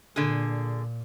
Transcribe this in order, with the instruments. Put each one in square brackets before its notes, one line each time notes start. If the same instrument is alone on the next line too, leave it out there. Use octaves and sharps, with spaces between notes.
[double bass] A#2 [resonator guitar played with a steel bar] D3 G#4